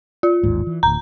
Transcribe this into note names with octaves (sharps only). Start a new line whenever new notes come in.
F4
A1 D#2 G#2
E3
D1 D2 A#5